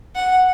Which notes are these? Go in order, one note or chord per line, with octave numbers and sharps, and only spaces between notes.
F#5